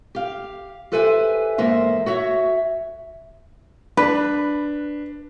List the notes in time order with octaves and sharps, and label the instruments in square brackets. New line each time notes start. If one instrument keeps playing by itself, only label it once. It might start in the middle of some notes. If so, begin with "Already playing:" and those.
[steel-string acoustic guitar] G4 F5
G4 A4 B4 C5 E5 G#5
E2 G#2 A#3 C5 E5
F#4 C#5 E5
[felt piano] D4 [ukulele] B4